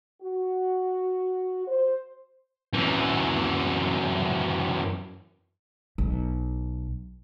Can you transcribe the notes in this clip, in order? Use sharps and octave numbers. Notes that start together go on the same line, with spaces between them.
F#4
C5
F#2 E3
B1